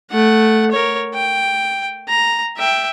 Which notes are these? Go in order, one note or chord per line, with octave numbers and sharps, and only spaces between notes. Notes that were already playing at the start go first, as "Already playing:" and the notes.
A3 F#5
A#4 C#5
G5
A#5
E5 G5